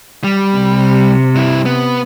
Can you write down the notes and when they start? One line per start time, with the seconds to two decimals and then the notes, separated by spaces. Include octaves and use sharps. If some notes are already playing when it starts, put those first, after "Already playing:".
0.24 G3
0.57 C3
1.35 G2 E4
1.65 B3